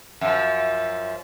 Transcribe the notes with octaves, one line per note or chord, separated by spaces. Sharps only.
F#2 F3